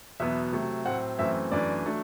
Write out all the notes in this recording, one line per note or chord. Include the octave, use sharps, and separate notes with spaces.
E2 B2 F#3 B3 E5
C3 F#3 A3
A2 F#3 C4 F#5
F#2 E3 A3 C4 E5
F#2 E3 A3 D4 D5
F#3 A3 D4